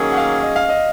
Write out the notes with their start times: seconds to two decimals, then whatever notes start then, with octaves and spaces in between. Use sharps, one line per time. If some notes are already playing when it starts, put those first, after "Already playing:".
Already playing: D#3 F#3 A#3 C#4 G#4
0.12 F#5
0.17 F5
0.43 D#5
0.56 F5
0.69 D#5